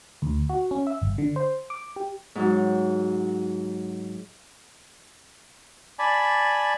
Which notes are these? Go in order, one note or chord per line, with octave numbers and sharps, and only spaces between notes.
D2
F#4
C#4
E5
G1
D3
C5
D6
G4
G#2 F#3
D5 G#5 A5 B5